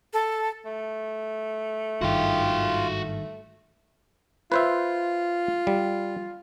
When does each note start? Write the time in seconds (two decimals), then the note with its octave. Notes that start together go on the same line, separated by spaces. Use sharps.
0.13 A4
0.66 A3
2.01 G#1 G2 D#3 F4 F#4 G5
2.45 A3
4.52 F4 B4 C5 E5
5.67 G3